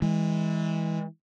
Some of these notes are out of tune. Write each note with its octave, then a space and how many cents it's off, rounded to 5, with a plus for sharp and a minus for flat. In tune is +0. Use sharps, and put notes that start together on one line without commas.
E3 -25 G#3 -15